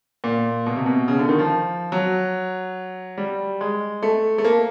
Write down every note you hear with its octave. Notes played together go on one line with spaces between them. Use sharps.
A#2
B2
C3
B2
C#3
D3
D#3
F3
F#3
G3
G#3
A3
A3
A#3